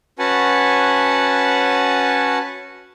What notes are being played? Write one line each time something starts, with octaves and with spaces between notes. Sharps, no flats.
C#4 F#4 B4 F#5 G#5 A5